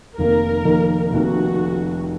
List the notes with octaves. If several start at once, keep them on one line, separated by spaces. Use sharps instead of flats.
F1 F2 D#3 A#3 A#4
F1 F2 D#3 A#3
F1 F2 D#3 A#3 F#4